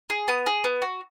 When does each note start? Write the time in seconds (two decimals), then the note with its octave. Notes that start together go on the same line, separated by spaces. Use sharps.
0.10 G#4
0.28 B3 D#6
0.46 G#4
0.64 B3
0.82 F#4